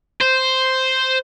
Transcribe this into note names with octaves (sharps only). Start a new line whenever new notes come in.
C5